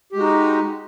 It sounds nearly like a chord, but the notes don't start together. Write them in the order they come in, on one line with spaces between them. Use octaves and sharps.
G4 G#3 F#4 D#4